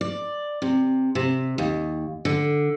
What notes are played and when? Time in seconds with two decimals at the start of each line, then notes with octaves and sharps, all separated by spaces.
0.01 D5
0.62 C3
1.15 C3
1.58 D#2
2.25 D3